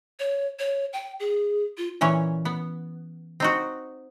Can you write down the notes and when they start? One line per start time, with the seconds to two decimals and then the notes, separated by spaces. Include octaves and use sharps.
0.20 C#5
0.59 C#5
0.93 G5
1.20 G#4
1.77 F4
2.01 A#2 E3 C#4 C#5
2.45 B3
3.40 C4 D#4 F#4